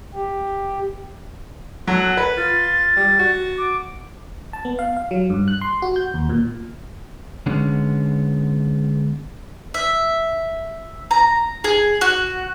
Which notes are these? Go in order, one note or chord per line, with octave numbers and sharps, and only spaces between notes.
G4
F#3 A4 F#5
B4
F4 A6
G3
F#4
D6
A5
B3
F5
F5
F#3
G2
F#6
C6
F#4
G6
D#2
A#2
D3 G#3 B3 C#4
E5
A#5
G#4
F#4